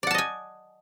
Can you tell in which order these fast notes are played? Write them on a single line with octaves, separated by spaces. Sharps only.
D5 F#5 A5 D#5 G#5